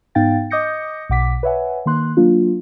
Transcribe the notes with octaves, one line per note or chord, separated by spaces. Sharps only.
G#2 B3 D#4 F5 G5 A6
D#5 D6 D#6 G6 A#6 C#7
B1 B2 F#5 D6 B6
B4 C#5 E5 F#5 G#5
D#3 A#3 C6 F#6
F#3 A#3 D4 F4